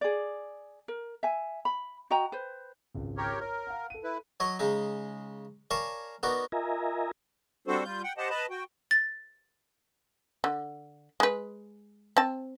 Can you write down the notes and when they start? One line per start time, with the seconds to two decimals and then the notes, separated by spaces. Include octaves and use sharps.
0.01 G#4 D5
0.88 A#4
1.23 E5 G#5
1.65 B5
2.10 F#4 D#5 G5 A#5
2.32 B4 C5
2.94 G#1 C#2
3.17 G4 A#4 C#5
3.40 A#4 C#5
3.67 F5 F#5
3.90 A4 D#7
4.04 E4 B4
4.40 F#3 C#5 D#5
4.59 C#3 G#3 D#4
5.71 A#4 C#5 D5 F5 G#5 A5
6.23 B3 D#4 F#4 A#4 D5
6.52 F4 A#4 D#5 E5 G#5 A#5
7.68 G3 C4 D4 F#4 A4 C5
7.84 G3 F4 G6
8.04 F#5 G5
8.18 G4 C5 D#5 F#5 A5
8.30 B4 D#5 A5 B5
8.50 F#4 G5
8.91 A6
10.44 D3
11.20 G#3 B4
12.17 C4 A5